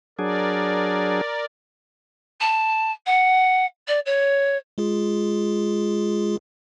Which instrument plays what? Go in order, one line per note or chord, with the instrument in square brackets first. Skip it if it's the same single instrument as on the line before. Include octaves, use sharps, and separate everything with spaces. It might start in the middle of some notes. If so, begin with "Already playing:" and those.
[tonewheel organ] F#3 D4 G#4 [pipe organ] A#4 D5
[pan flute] A5
F#5
D5
C#5
[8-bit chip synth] G#3 F4 G#4